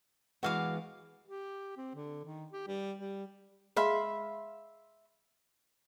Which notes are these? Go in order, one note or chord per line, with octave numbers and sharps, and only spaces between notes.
E3 G#3 B3 F#4 F5 D6
G4
C4
D3
D#3
G4
G3
G3
G#3 E5 F5 B5 C6